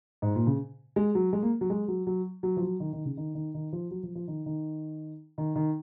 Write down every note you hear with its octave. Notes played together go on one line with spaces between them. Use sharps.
G#2
A#2
C#3
G#3
F#3
G#3
A#3
F#3
G#3
F#3
F#3
F#3
F3
F#3
D#3
D#3
C#3
D#3
D#3
D#3
F3
F#3
F3
F3
D#3
D#3
D#3
D#3